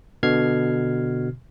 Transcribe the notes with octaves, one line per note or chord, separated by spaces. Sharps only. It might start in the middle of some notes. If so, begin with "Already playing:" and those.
B2 D3 F6 G#6 C7